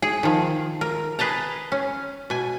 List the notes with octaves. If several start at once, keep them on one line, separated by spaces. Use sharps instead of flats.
G#4
D#3 F3
A#4
G#4 B4 D#5 A5 A#5
C#4
B2 G#5